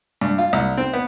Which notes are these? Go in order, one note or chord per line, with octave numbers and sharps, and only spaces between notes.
G2
F4
C2
C4
B3